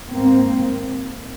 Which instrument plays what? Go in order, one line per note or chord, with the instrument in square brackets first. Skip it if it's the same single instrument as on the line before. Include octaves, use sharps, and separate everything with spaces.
[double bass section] G#2 A#3 C4